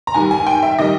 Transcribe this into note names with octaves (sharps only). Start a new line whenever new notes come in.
A#5
G#2 D#3 G3 G#5
G#5
G5
E5
D#3 G3 D#5